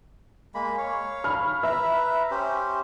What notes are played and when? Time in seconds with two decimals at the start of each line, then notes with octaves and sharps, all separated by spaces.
0.55 G#3 A#3 B5
0.78 C#5 F5
1.24 B5 F6
1.63 B4 E5 A#5
2.31 C#4 G4 C5